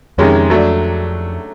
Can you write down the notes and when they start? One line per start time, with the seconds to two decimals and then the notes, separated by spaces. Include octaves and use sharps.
0.18 F2 C3 D#3 G#3 C#4
0.50 F#3 A3 D4